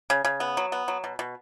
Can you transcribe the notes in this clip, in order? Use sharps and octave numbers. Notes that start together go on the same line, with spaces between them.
C#3
C#3
B3
F#3
B3
F#3
B2
B2